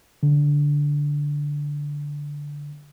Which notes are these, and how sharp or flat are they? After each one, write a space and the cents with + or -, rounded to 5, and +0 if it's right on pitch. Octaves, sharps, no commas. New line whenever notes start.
D3 -10